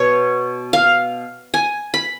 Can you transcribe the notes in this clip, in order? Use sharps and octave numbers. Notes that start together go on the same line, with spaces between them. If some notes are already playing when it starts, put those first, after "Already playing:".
Already playing: B2 C#5
F5
G#5
B5